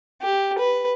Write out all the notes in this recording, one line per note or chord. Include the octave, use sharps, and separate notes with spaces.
G4
B4